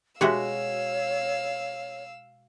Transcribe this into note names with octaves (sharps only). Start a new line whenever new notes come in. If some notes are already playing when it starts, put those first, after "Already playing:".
B2 G#3 F#4 G4 C#5 E5 F5 E6